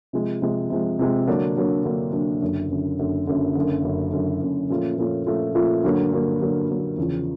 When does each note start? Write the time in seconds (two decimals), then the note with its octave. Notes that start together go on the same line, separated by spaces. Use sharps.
0.13 C3 F3 G#3
0.42 C3 F3 G#3
0.70 C3 F3 G#3
0.99 C3 F3 G#3
1.27 D3 F#3 A#3 D4
1.57 D3 F#3 A#3 D4
1.84 D3 F#3 A#3 D4
2.13 D3 F#3 A#3 D4
2.41 F#1 F#2 D3
2.70 F#1 F#2 D3
2.98 F#1 F#2 D3
3.27 F#1 F#2 D3
3.55 F#1 F#2 D3
3.84 F#1 F#2 D3
4.12 F#1 F#2 D3
4.41 F#1 F#2 D3
4.70 A#2 F3 A3 C#4 F4
4.98 A#2 F3 A3 C#4 F4
5.27 A#2 F3 A3 C#4 F4
5.55 A#2 F3 A3 C#4 F4
5.83 G2 D3 F#3 A#3
6.12 G2 D3 F#3 A#3
6.41 G2 D3 F#3 A#3
6.69 G2 D3 F#3 A#3
6.97 E2 C#3 F3